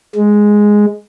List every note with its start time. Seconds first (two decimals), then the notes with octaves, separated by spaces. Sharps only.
0.15 G#3